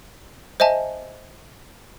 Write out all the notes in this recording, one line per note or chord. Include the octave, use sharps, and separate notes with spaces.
C5 D#5 E5 G#5 A5